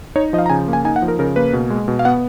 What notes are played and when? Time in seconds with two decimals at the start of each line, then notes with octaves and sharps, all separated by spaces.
0.16 D#4 C#5
0.33 F3 D#5
0.38 F5
0.46 A#5
0.50 C#3 G#5
0.68 A#3
0.73 G#5
0.85 D#4 G#5
0.96 F#5
1.02 F3
1.08 A#4
1.19 C#3 A#4
1.36 A#3 B4
1.53 B2
1.70 G#3
1.88 B2
1.99 F5
2.05 B3 F#5